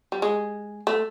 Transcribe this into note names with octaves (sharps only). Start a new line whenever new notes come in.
G3
G#3
A3